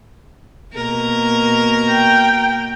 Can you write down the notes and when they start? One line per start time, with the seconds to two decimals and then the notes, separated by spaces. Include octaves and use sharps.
0.75 B2 A#3 A#4
1.91 G5